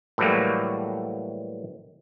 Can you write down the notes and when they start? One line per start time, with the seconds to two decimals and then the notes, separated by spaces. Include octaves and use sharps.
0.18 A2 E3 F#3 G3 A#3